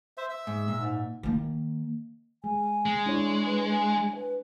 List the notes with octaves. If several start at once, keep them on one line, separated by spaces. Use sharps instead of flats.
C5 E5
E5 E6
G#2
A#2
G#2
D#3 A#3
G#3 G#5
G#3
D4 E4 C#5
B4
G#5
B4